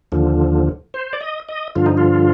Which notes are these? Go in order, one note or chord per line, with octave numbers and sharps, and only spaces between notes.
D#2 D3 F3
C5
D5
D#5
D#5
G2 D3 F3 F4
D#4
F4